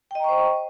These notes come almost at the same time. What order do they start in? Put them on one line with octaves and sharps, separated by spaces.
G5 D#5 A#5 C#6 C5